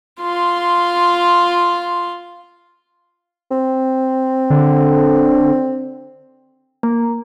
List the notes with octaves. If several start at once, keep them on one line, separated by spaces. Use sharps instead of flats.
F4 C6
C4
D3
A#3